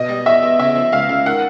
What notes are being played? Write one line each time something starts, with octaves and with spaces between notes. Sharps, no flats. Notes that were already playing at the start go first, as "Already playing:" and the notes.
Already playing: B2 D#5
G3
E2 E5
E2
C#3 E5
F3
C#2 F5
C#2
D#3 F#5